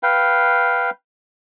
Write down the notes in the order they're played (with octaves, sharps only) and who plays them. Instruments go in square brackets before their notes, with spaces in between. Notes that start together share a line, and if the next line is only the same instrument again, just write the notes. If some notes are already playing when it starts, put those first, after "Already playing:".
[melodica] B4 F5 G5